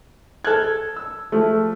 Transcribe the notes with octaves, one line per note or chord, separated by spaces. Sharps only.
A4 F6 F#6 G#6
E6
F3 A3